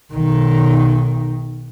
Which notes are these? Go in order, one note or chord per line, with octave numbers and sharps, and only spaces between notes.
B1 D#3